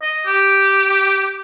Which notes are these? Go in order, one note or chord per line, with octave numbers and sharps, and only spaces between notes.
D#5
G4